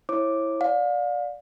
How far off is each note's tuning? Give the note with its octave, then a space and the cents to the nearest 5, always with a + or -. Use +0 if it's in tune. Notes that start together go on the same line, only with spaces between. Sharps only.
E4 +0 C#5 -35 D6 +0
D5 +0 F5 +35